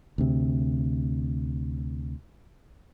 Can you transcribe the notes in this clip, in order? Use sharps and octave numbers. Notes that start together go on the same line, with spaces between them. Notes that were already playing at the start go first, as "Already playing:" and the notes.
D2 C3